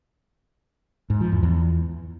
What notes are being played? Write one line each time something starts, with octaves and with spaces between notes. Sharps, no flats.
G#2
F3
E2
E2